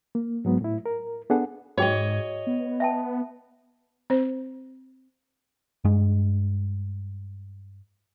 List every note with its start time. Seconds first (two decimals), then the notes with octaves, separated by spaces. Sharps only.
0.15 A#3
0.45 G#2 F#3 B3
0.61 A2 E4
0.86 A#4
1.30 B3 D4 G#4 A4 F#5
1.78 G#2 F#4 G#4 C#5 D#5 G5
2.47 B3
2.80 E5 G5 A5
4.10 C4 C5
5.84 G2 G#3